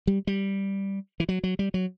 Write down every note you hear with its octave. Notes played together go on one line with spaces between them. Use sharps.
G3
G3
E3
F#3
F#3
G3
F#3